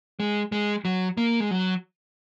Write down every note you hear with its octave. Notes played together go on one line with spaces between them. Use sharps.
G#3
G#3
F#3
A#3
G#3
F#3